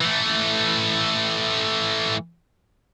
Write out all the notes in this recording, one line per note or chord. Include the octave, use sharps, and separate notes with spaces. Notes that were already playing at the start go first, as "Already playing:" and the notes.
E3 A3